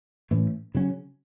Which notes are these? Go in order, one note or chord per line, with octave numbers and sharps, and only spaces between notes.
A2 E3 A3 C#4
C#3 F#3 C#4